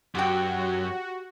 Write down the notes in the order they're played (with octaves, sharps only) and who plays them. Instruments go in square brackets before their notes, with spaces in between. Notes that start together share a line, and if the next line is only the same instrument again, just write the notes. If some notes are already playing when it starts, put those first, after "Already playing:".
[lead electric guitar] F#2 [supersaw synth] F#4 [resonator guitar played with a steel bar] G4 G5